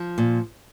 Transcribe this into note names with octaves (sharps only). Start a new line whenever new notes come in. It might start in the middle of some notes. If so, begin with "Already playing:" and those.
Already playing: F3
A#2